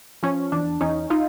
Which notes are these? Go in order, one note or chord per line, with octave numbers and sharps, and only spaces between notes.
F3 C#4
E2 D4
E2 C#4 D#4
D#4 F4